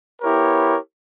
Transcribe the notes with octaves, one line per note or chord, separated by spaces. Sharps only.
B3 E4 G4 A#4 C#5